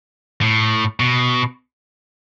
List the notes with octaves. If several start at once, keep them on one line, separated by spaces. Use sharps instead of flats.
A2
B2